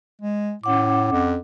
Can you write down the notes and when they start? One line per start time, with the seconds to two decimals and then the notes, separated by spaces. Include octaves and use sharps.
0.22 G#3
0.63 A2 C#4 F#5 D6
1.12 F2